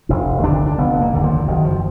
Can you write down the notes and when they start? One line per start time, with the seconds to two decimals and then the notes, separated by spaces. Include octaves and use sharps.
0.09 F1 D4
0.43 D#2 D3 D4
0.66 D4
0.78 F1 B3
1.01 A#3
1.13 D#2 D3
1.24 F3
1.47 F#1 D#3
1.65 F3